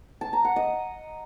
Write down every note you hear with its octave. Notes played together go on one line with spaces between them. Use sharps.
A5
A#5
F#5
D#5